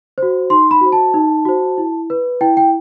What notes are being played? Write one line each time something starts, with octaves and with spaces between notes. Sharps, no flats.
F#4 C5
D#4 C6
B5
F#4 C5
A5
D#4
F#4 C5
E4
B4
E4 G5
G5